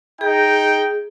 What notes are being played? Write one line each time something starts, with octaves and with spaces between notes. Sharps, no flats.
D#4 G#4 G5